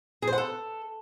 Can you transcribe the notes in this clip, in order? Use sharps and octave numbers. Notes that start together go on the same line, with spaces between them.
G#4
C5
F#5
A4